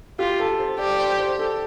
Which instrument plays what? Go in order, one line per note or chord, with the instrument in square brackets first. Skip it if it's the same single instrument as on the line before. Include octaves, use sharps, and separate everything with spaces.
[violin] F4 [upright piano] G4
[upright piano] A4
C5
[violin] G4 [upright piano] D5
[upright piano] D5
C5
C5
A4